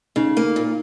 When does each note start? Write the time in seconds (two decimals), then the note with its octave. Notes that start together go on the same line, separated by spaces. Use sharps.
0.16 C#3 D#4
0.37 A#3
0.56 A#2